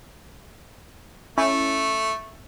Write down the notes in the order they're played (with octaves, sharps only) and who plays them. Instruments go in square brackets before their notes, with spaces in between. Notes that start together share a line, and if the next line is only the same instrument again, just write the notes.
[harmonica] A3 [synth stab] C#4 E4